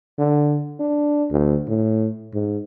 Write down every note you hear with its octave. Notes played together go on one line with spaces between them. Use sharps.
D3
D4
D2
A2
G#2